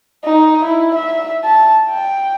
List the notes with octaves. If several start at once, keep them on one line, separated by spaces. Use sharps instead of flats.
D#4
E4
E5
A5
G5